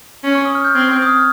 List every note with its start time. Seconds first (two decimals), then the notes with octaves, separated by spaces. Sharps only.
0.24 C#4
0.35 C#6
0.45 D#6
0.55 F6
0.64 G6
0.75 C4 G#6
0.92 G6
1.02 D#6
1.09 F6